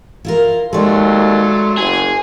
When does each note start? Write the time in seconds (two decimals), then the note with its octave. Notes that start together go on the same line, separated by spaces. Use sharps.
0.25 E4 F4 A#4
0.73 D#2 F#3 G#3 A3 D5 C6
1.78 F#1 G#4